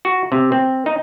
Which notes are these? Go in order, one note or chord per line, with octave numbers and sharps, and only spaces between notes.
F#4
C3
C4
D#4